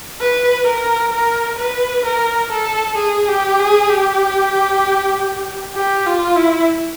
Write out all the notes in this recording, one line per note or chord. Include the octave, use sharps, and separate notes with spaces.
B4
A#4
A#4
B4
A#4
A4
G#4
G4
G#4
G4
G4
F4
E4